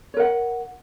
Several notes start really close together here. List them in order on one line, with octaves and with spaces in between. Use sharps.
C#5 A#4 F#5